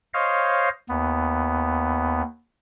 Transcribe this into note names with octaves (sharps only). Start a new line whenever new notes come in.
C5 C#5 D#5 F5
D#2 B3